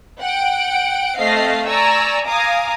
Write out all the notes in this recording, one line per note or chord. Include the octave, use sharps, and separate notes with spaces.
F#5 G5 D7
A3 C4 D#5 F5 A#6 C7
D5 G#5 A#5 C#6 E6
F5 G#5 A#5 D6 D#6